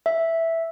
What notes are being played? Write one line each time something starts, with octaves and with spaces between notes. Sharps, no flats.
E5